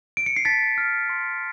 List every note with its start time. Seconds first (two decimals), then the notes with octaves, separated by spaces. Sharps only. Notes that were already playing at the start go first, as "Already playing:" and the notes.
0.17 D7
0.26 C#7
0.36 C7
0.45 A5 A6 B6
0.78 F6
1.09 C6